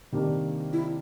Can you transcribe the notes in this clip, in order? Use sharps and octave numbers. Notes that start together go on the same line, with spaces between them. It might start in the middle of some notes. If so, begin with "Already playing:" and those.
C3 D#3 G3 A#3 D4
E4